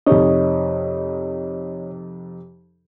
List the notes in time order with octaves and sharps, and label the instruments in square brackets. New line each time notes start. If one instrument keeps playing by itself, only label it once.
[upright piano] F2 C3 D#4 [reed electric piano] C#5 D#5